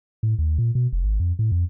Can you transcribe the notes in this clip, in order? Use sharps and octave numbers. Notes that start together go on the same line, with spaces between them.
A2
D#2
A#2
B2
F1
G#1
F2
A2
F2